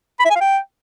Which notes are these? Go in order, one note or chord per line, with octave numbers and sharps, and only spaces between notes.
B5
E5
G#5
F5
G5